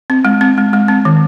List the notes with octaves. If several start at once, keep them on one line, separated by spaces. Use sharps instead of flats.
C4
G#3
C4
G#3
G#3
C4
D#3